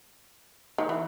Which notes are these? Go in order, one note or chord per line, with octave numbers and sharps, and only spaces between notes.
D#3
E3